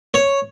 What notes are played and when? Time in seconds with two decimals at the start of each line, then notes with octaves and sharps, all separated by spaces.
0.14 C#5